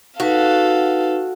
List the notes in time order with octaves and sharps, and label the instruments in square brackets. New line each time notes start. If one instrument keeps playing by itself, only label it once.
[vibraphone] D#4 B4 [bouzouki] F#4 [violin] A4 F5